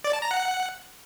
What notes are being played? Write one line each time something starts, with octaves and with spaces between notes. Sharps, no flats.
D5
A5
A#5
F#5